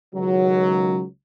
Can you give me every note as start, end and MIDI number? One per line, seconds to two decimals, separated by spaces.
0.14 1.04 37
0.14 1.04 51
0.14 1.04 54